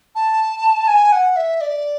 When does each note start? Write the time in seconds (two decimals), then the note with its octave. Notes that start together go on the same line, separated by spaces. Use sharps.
0.15 A5
0.87 G#5
1.12 F#5
1.36 E5
1.61 D5